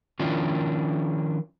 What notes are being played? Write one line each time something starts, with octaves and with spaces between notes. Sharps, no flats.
D#3 F3 C#4 D4 E4 F4